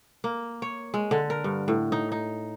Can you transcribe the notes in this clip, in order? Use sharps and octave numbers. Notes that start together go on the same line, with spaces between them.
A#3
C#5
G#3
D3
A#4
G2
A2
D#4
D#4